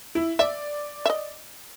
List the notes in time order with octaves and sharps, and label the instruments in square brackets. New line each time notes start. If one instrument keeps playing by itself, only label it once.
[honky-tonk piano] E4
[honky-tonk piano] D5 [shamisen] E5
[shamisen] D#5 E5